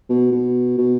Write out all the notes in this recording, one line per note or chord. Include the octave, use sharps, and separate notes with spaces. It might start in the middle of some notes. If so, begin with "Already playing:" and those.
B2
B2
B2